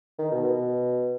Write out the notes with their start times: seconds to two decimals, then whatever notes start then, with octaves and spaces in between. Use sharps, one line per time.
0.19 D#3
0.31 B2
0.44 B2